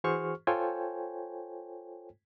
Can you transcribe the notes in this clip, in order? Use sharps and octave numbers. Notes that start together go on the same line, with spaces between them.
E3 F#4 G#4 C5 C#6 F6
F4 A4 C5 C#5 G5 G#5